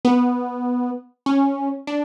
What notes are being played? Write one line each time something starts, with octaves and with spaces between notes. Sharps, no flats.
B3
C#4
D4